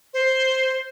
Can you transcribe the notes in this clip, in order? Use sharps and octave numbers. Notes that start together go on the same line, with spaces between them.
C5